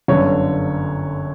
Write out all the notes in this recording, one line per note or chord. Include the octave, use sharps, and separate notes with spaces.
G1 F#2 D3 C#5